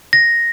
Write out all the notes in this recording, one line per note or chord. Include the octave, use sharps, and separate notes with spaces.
A#6